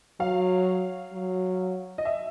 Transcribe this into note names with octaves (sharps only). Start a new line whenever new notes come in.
F#3 F5
F#3
D#5
E5